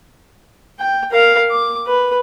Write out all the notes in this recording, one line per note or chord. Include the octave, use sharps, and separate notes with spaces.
G5
A#4 F5
D6
B4